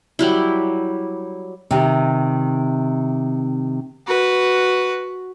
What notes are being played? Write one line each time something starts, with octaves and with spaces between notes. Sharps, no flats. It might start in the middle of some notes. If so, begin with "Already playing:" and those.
F#3 G3 E4
C3 D#3
F#4 B4